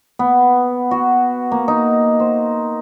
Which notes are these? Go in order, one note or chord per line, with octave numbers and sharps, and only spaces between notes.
B3
F#4
A#3
D#4
C5